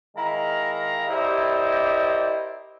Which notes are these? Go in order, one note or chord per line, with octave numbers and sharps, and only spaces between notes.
D#3 G#3 E4 F5 A#5
E4 G4 A#4 C5 D5 D#5